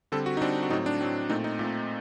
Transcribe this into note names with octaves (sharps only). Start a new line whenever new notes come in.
D3 G3 C4 A4
F#4
D#4
D3 G3 C4 D4
F#4
A2 F#3 C4 D#4
D4
A2 F#3 C4
A#2 A3 C4 D#4
D#4
A#2 A3 C4